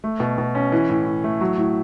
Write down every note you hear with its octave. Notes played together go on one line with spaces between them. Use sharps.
A3
B2
B2
C#4
E3
A2
A2
A3
F#3
A2